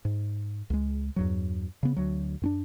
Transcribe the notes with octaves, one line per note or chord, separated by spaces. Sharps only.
G#2
C#2 G#3
E2 G2 F#3
C#3 B3
D2 F#3
F#2 C4 D4